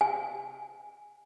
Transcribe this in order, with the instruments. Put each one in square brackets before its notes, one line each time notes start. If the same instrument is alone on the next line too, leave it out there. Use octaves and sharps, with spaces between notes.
[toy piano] G#5